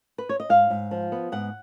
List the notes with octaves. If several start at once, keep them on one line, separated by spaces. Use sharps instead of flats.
B4
C#5
D#5
G#2 F5
G#2
F3
B3
G#2 F#5